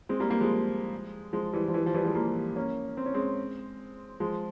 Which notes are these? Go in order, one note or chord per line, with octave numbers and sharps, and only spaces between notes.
G#3 C4
G3 A#3
G3 A#3
F3 G#3
F3 G#3
E3 G3
F3
E3 G3
F3
E3 G3
F3 G#3
G3 A#3
A#3 C#4
C4
C#4
G#3 C4
F3 G#3